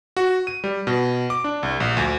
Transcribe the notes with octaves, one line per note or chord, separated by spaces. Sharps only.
F#4
D#7
G3
B2
D6
D4
C2
A#1
D2